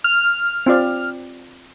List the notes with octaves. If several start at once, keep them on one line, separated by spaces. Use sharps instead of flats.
F6
C4 F4 D5